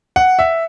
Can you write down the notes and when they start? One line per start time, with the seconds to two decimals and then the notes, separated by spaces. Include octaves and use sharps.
0.16 F#5
0.39 E5